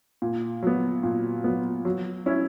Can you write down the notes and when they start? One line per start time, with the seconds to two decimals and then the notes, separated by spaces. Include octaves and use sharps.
0.22 A#2
0.63 F#3 B3
1.03 A#2
1.44 F#3 B3
1.85 F#3
2.26 C#4 E4